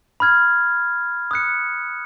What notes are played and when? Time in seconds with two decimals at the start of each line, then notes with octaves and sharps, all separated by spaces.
0.20 B5 F6 G#6
1.31 D#6 F#6 C#7